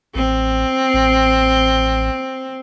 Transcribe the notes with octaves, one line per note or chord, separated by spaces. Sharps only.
A1 C4
A1